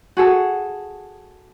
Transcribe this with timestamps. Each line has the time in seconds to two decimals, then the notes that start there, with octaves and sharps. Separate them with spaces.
0.17 F#4 G#4 A4